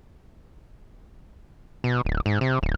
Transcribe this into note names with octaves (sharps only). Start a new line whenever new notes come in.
B2
D1
G#2
C3
D1